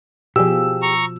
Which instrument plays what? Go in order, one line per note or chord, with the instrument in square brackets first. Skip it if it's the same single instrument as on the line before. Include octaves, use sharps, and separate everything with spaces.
[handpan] B2 F3 [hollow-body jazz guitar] G4 G#4 [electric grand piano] E6
[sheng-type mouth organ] A#5 C#6